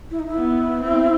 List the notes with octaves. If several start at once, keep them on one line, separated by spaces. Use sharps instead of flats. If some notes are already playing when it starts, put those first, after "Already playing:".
E4
D#4
E4
B3
C4